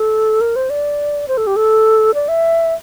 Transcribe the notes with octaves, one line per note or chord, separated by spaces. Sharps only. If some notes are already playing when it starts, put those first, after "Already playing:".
Already playing: A4
A#4
C5
D5
C5
A4
G4
A4
D5
E5